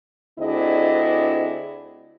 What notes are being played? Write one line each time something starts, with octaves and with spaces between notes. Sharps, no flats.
D2 C4 D4 E4 G#4 D#5